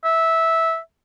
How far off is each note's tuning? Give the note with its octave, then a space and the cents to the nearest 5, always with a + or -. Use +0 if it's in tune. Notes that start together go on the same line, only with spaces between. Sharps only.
E5 -10